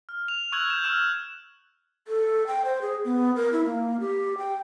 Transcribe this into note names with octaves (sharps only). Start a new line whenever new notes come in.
F6
F7
C#6 E6 F#6 G#6 F#7
G6 E7
C#6 E6 F6 E7
A4
G5
C5
G#4
B3
A#4
E4
A#3
G4
G5